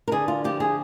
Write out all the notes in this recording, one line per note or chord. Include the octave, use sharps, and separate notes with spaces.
A#4
D3 G#4
F4
F3 G4
G#4